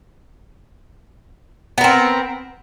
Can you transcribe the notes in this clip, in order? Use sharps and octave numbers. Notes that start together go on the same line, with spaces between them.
B3 C4 A#4